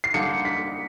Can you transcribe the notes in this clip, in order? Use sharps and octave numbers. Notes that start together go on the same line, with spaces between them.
C7
D3 G3 A#3 D#4 C#7
B6